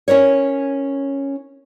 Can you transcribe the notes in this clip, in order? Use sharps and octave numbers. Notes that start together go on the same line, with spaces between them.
C#4 E4 A#4 C#5